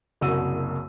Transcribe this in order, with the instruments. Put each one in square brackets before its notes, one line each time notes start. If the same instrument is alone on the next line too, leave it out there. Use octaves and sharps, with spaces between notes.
[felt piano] F#1 C2 F#2 F#4 E6 D#7